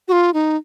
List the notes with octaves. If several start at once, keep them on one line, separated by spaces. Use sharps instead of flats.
F#4
F4
D#4